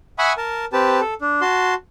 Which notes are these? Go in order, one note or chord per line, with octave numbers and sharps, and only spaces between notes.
E5 F#5 G#5 B5 C#6 D#6
A#4 A5
C4 G4 B4 A5
A4
D4
F#4 A5 C6